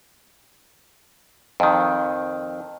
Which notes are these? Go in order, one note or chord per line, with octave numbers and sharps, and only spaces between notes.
F2 D#3